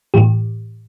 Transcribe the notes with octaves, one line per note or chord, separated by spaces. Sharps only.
A2 E3 G4